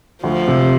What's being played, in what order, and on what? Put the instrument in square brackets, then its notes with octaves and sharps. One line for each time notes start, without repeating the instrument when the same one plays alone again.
[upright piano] D2 [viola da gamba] F3
[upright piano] C3